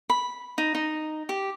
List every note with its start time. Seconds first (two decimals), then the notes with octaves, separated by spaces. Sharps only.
0.10 B5
0.58 D#4
0.75 D#4
1.29 G4